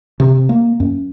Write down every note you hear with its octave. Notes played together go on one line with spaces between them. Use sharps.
C3
A#3
F#2